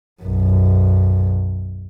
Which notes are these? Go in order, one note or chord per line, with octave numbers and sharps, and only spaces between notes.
B1 F#2